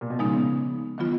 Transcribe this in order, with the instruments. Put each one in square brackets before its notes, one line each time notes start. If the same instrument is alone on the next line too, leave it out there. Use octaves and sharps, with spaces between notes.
[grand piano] A#2
B2
[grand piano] C#3 [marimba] F3 G#3 B3 D#4
[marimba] D#3 F#3 B3 F4